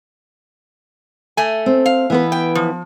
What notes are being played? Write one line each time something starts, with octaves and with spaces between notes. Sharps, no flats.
A3 G#5
C4
F5
E3 B3 B4
G5
F3